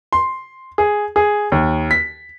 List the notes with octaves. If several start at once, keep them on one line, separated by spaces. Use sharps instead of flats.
C6
G#4
G#4
D#2
B6